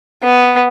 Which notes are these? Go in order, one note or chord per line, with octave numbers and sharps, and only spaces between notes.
B3